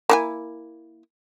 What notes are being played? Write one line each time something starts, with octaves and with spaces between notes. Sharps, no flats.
A#3 E4 G#5